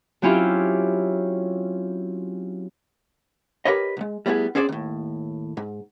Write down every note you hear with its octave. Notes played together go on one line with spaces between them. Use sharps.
F#3 C4 C#4 E4 F4 G4
G4 A#4 B4 C#5 D#5
B1 G#3
G3 A3 B3 E4 G#4
C4 C#4 G#4 C5 D5
D#2 A2
G#2